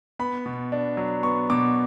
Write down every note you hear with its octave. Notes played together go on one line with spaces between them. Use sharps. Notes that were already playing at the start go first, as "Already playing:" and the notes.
B3 B5
B2
D4
F#3
B3 C#6
B2 D6